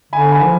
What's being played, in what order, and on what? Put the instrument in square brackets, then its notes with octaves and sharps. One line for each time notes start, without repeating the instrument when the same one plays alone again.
[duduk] D3 [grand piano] G#5 B5
[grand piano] G#5 B5
[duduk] F3